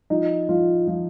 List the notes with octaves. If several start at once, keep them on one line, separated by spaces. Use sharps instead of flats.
F3 D#4
F3 F4
F3